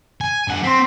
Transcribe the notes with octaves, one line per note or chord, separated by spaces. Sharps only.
G#5
G2 F#5
C4 C6 B6